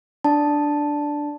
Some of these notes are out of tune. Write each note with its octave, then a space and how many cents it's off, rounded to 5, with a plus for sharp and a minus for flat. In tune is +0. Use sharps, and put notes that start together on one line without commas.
D4 +0 D5 +0 A5 +0